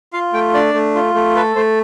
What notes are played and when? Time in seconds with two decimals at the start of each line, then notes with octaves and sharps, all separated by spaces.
0.13 F4 F5
0.33 A3 G5
0.54 D4 D5
0.74 A3
0.95 F4
1.14 A3
1.35 A4 B4
1.55 A3 C5